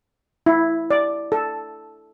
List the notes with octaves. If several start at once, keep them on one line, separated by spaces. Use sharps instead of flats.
E4
D5
A4